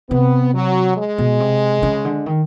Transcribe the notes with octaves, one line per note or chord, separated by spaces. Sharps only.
C3 B3
F#3
G#3
B2
C3
C#3
D3
D#3